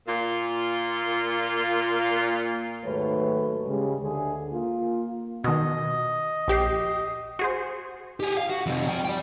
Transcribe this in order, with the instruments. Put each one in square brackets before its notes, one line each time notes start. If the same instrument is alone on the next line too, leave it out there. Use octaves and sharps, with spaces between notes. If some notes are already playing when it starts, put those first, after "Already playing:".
[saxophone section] A#2 F4
[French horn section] D#2 G#2 F#3 A3 B4 C#5
C#3 G3 G#3
D2 D3 G#4
A#3 F4
[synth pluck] B2 D#3 [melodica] D#5
[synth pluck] A#1 G4 C7
F#4 G#4 C5
[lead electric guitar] G4 G#4
F5
F#4
F2 C3
F3 G5
D5 G5